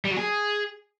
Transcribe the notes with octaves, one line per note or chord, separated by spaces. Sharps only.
G3
F#3
G#4